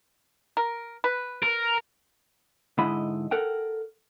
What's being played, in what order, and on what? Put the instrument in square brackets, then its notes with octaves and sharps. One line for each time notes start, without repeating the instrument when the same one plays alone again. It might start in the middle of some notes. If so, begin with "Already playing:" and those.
[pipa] A#4
B4
[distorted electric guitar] A#4
[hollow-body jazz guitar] G#2 D3 G#3 E4 D#5 B5
A4 A#4 F#5 G5